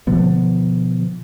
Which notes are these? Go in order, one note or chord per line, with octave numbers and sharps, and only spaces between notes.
B2 D3 F3 B3